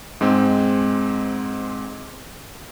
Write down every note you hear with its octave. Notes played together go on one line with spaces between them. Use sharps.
G#2 G#3 C4